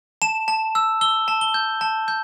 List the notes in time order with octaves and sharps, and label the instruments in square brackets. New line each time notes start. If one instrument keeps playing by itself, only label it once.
[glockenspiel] A5 E7
A5
E6
E6 G7
A5
G7
G6
A5
G6